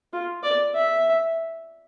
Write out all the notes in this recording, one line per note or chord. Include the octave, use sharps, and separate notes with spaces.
F4
D5
E5